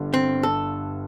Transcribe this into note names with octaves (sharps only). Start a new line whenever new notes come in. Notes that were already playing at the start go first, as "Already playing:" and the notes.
Already playing: G1 G2 D3
C4
A4